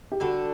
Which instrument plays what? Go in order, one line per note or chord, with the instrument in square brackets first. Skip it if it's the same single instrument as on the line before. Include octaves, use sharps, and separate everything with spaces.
[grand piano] G4
[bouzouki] D3 G3 D4 A4 [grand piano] F#4